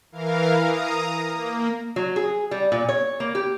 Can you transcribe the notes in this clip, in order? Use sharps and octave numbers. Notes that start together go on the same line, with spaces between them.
E3 A#4 F5
A#5 D#6
A#3
F#3
G#4
G3
A#2
C#5
A#3
G4